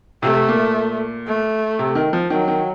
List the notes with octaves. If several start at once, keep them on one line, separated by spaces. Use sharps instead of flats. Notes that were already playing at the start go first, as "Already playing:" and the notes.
C3 A3
A#2
A3
C3
D#3
F3
D#3 F#3
D#3